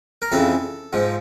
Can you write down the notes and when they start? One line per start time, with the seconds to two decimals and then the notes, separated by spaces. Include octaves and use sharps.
0.22 A#4
0.32 F2 C#3 E3 A4
0.93 G#2 F3